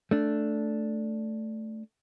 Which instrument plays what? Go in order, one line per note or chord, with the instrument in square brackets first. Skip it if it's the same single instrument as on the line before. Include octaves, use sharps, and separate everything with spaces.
[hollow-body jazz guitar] A3 D4